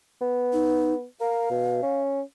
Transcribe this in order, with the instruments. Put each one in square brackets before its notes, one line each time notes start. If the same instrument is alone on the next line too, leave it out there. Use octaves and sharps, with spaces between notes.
[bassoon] B3
[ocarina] D#4
[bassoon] A#4 [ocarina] F5
[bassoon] B2
C#4